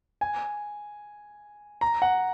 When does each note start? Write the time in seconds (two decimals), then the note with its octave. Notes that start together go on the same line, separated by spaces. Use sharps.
0.21 G#5
1.81 A#5
2.02 F#5